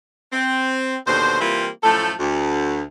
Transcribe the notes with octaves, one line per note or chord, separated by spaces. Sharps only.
C4
D#2 B2 D3 C5
E3 G3 A#3 C4 E4 F4
F#2 A2 F3 A3 A4
D2